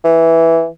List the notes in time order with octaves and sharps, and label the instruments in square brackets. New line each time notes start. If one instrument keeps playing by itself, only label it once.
[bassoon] E3